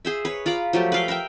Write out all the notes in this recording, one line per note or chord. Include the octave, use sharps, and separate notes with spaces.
G#4 C5 E5
B4 C#5
F4 A#5 B5 D6
F3 F#3 A3 G4
B4 F5 G5
A#4 B4 E5 G5